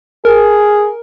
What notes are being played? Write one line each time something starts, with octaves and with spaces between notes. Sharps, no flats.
G#4 A#4